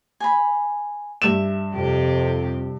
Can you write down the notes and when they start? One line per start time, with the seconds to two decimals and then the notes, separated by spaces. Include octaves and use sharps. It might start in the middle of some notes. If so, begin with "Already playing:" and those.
0.20 G#5 B5
1.22 G2 E5 E7
1.74 F2 C3 G4